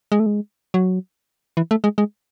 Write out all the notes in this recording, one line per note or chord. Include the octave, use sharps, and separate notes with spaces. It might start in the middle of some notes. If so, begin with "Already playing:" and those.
G#3
A3
G#3
F#3
E3
A3
G#3
G#3